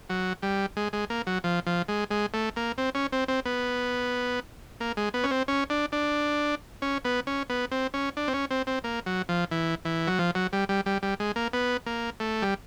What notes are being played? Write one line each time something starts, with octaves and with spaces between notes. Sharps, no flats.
F#3
G3
G#3
G#3
A#3
F#3
F3
F3
G#3
G#3
A3
A#3
C4
C#4
C4
C4
B3
A#3
G#3
B3
C#4
C4
C#4
D4
D4
C#4
B3
C#4
B3
C4
C#4
D4
C4
C#4
C4
C4
A#3
F#3
F3
E3
E3
F#3
F3
F#3
G3
G3
G3
G3
G#3
A#3
B3
A#3
A3
G3